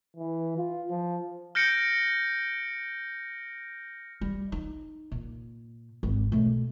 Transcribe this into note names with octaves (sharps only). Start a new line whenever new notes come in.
E3
F4
F3
F6 G6 A#6 C#7 D7
G3
D#4
A#2
G#1 C4
B2 A3